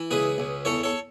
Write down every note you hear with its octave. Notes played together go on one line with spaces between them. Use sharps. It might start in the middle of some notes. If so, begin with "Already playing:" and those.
Already playing: E3
C#2 G#4 B4
C#2
E2 A4 C#5
A4 C#5